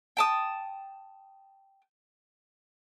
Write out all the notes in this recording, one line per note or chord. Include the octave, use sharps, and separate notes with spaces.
G5 A5 D#6